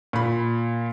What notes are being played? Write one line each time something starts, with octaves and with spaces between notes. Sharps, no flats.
A#2 B5